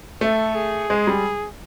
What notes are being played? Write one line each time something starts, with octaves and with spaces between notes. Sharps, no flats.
A3 A4
G#4
G#3
G3